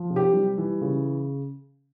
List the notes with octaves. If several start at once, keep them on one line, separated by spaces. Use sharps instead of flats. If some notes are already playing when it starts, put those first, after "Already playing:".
Already playing: F3
C3
G4
G3
E3
C#3